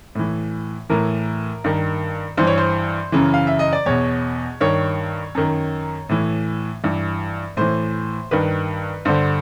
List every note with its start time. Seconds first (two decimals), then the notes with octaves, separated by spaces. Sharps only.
0.15 A2 E3
0.90 A2 E3 A#4
1.64 G2 D#3
2.38 G2 E3 C5
2.47 C#5
2.58 C5
3.12 F#2 C#3 E3
3.34 F5
3.47 E5
3.59 D#5
3.73 D5
3.86 E2 B2 C#5
4.61 G2 D#3 C#5
5.35 F#2 D#3
6.09 A2 E3
6.84 G2 E3
7.57 A2 E3 C5
8.31 G2 D#3 B4
9.05 G2 D3 C5